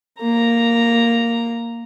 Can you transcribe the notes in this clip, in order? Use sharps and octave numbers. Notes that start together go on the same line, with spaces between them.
A#3 A#5